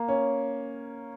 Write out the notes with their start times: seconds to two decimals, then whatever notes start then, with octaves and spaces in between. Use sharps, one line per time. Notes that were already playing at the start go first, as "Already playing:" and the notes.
Already playing: A#3
0.08 C#4